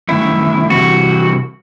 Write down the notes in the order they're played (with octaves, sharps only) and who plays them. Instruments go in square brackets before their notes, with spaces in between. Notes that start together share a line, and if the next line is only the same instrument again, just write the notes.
[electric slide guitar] G2 D#3 A3 [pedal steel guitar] E4
[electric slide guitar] C3 E3 G3 [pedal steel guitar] F#4